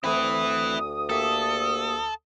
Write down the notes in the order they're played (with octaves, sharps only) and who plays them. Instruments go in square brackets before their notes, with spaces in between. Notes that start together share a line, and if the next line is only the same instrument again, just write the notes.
[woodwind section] D2 D#6 [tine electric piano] A3 C4 [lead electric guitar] E4 B4
[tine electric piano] A#3 G4 E5 [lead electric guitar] A4